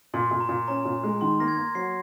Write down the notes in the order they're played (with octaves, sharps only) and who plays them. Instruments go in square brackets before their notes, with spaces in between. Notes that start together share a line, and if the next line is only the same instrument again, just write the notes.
[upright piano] A#2 [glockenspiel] C6
[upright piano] A#2
[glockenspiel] A#5
[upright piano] A#2
[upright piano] C#4 [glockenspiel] A#5
[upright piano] A#2
G#3
[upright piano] D#3 [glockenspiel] C6
[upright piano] A#3 [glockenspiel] A#6
[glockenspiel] G#6
[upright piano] A#3
[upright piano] F#3 [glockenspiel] C7